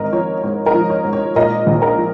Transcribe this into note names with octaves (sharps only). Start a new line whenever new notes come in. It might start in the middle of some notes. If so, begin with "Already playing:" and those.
Already playing: G#1 G#2 A#4 D#5
F3 C#5
G#2 C#5
A#4 D#5
F3
C#5
G#2
C#5
A#2 A#4 D#5
A#1
A#4
F3